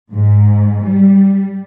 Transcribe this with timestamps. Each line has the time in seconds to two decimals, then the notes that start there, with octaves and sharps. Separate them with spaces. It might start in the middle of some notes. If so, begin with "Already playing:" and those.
0.12 G#2
0.84 G3